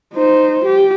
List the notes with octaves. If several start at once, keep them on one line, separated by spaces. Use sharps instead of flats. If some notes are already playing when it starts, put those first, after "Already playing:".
D#4 C5
G4